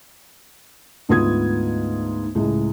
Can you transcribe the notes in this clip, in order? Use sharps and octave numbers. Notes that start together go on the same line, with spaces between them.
D2 G#2 B3 F4 D#6 G#6
C#2 A2 G#3